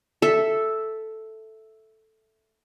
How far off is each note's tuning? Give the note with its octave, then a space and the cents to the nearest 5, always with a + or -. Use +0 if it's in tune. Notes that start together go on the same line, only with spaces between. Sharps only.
A4 +0 E5 +0